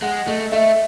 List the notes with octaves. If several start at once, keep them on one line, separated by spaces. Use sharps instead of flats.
G#3 F#5
A3 D#5
A3 E5